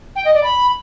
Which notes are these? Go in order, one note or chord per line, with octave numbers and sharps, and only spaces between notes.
G5
D#5
D5
B5